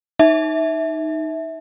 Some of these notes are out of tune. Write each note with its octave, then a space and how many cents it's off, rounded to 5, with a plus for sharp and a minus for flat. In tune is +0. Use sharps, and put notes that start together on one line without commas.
D#4 +0 E5 -15